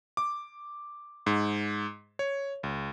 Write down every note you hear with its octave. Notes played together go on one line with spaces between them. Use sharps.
D6
G#2
C#5
C#2